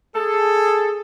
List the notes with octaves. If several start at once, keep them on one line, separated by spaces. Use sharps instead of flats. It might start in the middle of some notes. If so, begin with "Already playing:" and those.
G#4 A4